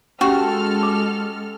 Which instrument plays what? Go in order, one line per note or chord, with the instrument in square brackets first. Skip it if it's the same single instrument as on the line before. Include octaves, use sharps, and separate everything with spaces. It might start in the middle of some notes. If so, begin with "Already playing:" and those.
[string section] G#3 A4 F6 [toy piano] C#4 G4 [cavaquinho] F#4
[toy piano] D6